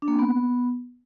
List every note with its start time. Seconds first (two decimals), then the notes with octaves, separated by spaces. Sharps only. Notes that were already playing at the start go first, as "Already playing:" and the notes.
0.02 D4
0.08 A#3
0.13 C4
0.19 B3